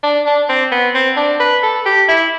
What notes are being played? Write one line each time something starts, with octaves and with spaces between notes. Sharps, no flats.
D4
D4
C4
B3
C4
D4
B4
A4
G4
E4